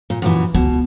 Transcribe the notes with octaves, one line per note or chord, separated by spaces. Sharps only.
A#2
F#2 A#2 E3
C#2 B2